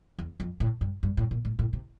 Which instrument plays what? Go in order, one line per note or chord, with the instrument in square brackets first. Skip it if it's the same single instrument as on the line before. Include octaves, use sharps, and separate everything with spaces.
[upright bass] E2
F2
A2
G2
G2
A2
A#2
A2
A2
C3